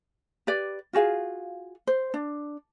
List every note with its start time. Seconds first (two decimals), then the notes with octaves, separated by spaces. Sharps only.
0.47 G4 B4 D5
0.93 F4 F#4 G#4 F5
1.87 C5
2.14 D4